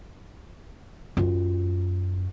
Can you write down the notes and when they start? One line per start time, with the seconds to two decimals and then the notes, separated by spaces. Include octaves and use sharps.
1.17 F#2 F4